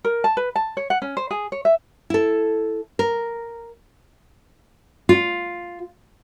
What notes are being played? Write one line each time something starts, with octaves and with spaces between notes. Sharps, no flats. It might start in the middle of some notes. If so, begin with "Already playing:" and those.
A#4
A5
B4
A5
C#5
F#5
C#4
C5
G#4
C#5
E5
E4 A4
A#4
F4